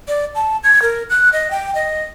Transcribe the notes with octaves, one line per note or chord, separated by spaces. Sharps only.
D5
A5
G#6
A#4
F#6
D#5
G5
D#5